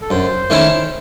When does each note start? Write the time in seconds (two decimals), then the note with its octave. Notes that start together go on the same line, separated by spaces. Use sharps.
0.01 A4
0.10 F#2 C5
0.50 D#3 A3 C#4 E4